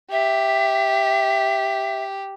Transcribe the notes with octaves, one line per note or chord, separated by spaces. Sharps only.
G4 E5